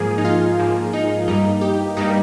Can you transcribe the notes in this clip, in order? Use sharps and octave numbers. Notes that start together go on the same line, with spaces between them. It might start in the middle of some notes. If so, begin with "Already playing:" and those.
Already playing: G#2 F3 A#3 G#4
D#4
F4
G#2 F3 A#3
D#4
G2 G3 A#3 D#4
G4
G2 G3 A#3 D#4